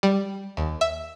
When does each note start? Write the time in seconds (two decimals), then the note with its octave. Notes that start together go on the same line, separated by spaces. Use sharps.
0.03 G3
0.57 D#2
0.81 E5